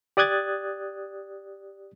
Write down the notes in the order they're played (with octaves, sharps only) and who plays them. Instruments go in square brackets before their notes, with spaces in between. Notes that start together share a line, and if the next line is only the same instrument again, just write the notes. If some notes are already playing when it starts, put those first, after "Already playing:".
[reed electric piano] G4 D5 D#6 F#6 G#6 A6